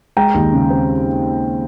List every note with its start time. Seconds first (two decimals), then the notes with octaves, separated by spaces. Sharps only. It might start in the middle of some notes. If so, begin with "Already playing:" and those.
0.17 G#3 G5 A#5
0.34 D#2
0.53 C#3
0.70 C4